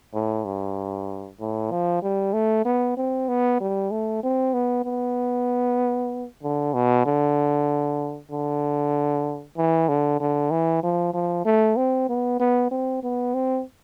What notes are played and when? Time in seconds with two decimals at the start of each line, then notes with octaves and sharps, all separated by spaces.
0.14 A2
0.45 G2
1.40 A2
1.71 F3
2.02 G3
2.33 A3
2.65 B3
2.97 C4
3.29 B3
3.60 G3
3.91 A3
4.23 C4
4.53 B3
4.85 B3
6.43 D3
6.74 B2
7.06 D3
8.31 D3
9.58 E3
9.89 D3
10.20 D3
10.51 E3
10.83 F3
11.14 F3
11.45 A3
11.77 C4
12.09 B3
12.40 B3
12.71 C4
13.03 B3
13.34 C4